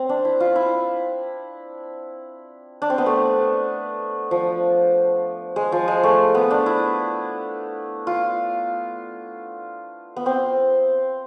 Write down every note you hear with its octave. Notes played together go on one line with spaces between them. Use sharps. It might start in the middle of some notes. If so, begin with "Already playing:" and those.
Already playing: C4
D4
E4
F4
E4
D4
C4
B3
A3
F3
G#3
F3
G#3
A3
B3
D4
E4
F4
B3
C4